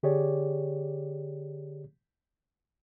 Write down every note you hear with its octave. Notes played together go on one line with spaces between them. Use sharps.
D3 G4 G#4 C#5 D5